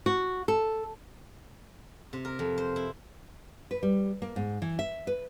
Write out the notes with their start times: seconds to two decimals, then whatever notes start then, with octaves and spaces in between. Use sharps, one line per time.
0.06 F#4
0.48 A4
2.13 C3
2.25 A#4
2.39 F2
2.58 C5
2.76 E4
3.71 B4
3.83 G3
4.22 A#3
4.36 G#2
4.62 E3
4.79 E5
5.07 B4